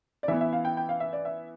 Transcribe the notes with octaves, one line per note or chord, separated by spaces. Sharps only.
D5
E3 B3 E4 E5
E5
F5
G5
G5
F5
E5
D5
E5